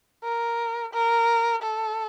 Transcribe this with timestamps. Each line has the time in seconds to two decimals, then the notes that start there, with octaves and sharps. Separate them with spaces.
0.24 A#4
0.93 A#4
1.62 A4